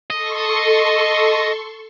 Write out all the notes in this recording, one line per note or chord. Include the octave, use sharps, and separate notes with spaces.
A4 D#5 C6 C#6